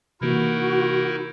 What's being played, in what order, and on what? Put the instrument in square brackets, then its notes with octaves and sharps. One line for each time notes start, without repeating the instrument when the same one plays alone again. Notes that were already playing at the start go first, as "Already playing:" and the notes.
[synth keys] C3 E3 A#3 [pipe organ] D#4 E4 A#4 [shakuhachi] F#4